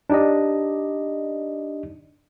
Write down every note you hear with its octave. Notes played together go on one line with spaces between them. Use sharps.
D4 D#4 G4 D5 D#5